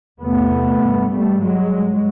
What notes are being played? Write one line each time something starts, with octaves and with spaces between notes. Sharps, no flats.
E2 C3 A3 B3
G2
G3 A3
G2 F#3 G#3